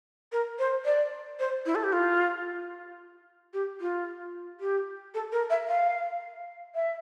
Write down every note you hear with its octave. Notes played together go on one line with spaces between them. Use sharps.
A#4
C5
D5
C5
E4
A4
G4
F4
G4
F4
G4
A4
A#4
E5
F5
E5